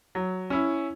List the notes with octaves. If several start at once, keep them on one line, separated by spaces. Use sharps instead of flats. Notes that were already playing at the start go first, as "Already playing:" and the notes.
F#3
C#4 E4